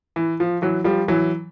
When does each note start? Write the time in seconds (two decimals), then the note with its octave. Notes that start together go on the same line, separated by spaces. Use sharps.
0.16 E3
0.40 F3
0.62 E3 F#3
0.84 F3 G3
1.08 E3 F#3